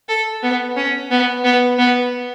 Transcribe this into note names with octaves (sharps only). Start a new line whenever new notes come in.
A4
B3
C#4
B3
B3
B3